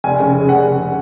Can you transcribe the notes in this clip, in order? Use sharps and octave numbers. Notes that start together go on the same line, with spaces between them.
F1 G#5
C#3
C#3
F1 F#5
C#3